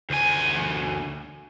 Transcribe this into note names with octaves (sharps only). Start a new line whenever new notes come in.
D2 G#5